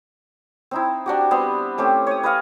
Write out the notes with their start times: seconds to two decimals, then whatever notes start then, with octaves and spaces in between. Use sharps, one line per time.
0.71 C4 D#4 E4
1.06 D4 F#4 G4
1.31 G3 B3 C4 C6
1.78 A3 C4 C#4 G4
2.07 C#5 D#6
2.23 B4 D#5 F5 G#5